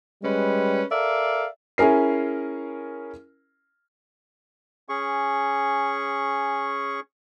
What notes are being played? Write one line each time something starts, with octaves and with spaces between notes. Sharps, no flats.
G3 G#3 C#4 B4
A4 A#4 D5 E5 F5
C#4 E4 G#4 A#4 C7
C#4 G#4 C#6